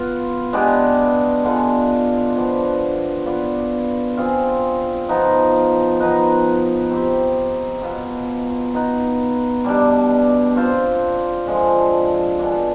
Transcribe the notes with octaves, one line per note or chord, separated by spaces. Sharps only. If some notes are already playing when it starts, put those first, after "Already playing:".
Already playing: B3 F4 B4
G#3 B3 D4 G4
D3 G#3 B3 F4
F3 B3 D4
B3 F4 B4 D5
C4 F4 G#4
F3 B3 D#4
F3 B3 D#4 B4
C4 G4 C5
B2 B3 F4
B3 D#4 B4
B2 G3 D4
C4 F4 C5
D3 F3 G#3
B2 B3 D4 G#4